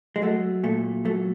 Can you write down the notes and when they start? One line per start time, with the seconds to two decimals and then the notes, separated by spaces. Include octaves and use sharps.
0.16 G#3
0.22 F#3 A3
0.64 A#2 A3
1.05 F#3 A3